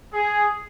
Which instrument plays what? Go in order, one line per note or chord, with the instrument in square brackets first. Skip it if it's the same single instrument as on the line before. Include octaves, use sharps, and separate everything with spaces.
[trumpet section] G#4